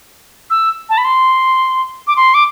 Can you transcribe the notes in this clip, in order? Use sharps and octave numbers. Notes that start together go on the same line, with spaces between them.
E6
A5
B5
C6
D6
C6
D6